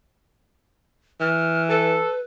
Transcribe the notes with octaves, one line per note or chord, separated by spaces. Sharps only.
E3 F6
A4 B4